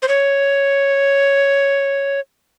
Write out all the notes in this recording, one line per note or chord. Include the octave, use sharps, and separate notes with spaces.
C5
C#5